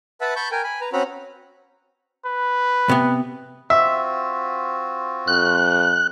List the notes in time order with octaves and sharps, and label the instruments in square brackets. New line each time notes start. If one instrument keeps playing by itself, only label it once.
[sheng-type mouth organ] B4 E5 F#5 A5 B5
A5 B5 C#6 G6
A#4 G5 G#5
G#5 B5
B4 A#5
C4 C#4 F#4 A#5 B5
[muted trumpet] B4
[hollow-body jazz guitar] C3 B3
[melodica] C4 F4 F#4 [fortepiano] E5
[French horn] F2 [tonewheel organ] F#6